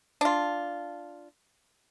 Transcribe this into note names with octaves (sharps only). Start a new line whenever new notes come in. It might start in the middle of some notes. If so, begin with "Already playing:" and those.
D4 F4